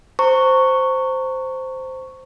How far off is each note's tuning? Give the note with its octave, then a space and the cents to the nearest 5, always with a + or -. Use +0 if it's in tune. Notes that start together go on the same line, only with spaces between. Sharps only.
C5 -5 A#5 -35 C#6 +0